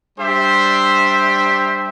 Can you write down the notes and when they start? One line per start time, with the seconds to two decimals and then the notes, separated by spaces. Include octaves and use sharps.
0.17 G3 D4 G4 C5 E5